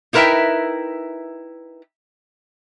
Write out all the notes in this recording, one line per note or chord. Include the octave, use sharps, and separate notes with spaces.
D#4 E4 A#4 B4 E5 G5